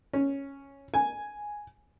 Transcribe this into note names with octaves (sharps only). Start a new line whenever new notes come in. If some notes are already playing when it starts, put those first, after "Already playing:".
C#4
G#5